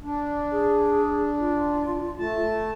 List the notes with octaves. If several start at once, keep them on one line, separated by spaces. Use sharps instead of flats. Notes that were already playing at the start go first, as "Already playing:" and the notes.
D4
G#4
F4
A3 A5